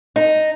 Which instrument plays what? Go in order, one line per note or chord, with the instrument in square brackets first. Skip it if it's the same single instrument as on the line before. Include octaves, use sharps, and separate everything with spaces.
[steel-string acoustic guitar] D#4